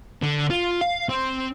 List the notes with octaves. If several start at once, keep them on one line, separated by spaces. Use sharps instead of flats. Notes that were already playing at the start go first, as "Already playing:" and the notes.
D3
F4
F5
C4